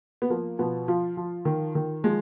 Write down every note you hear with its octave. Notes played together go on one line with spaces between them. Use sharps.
B3
F3 A#3
B2 F3 B3
F3 F4
F3
D#3
D#3
F3 G#3